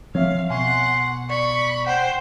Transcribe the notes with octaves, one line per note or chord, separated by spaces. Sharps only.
F3 C4 C#5 E5 F5
B2 F#5 G#5 C6 C#6
D5 B5 C#6
C5 F#5 G5